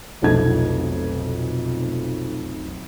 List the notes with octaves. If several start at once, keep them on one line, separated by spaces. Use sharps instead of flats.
F1 B1 F2 A3 D#4 G#6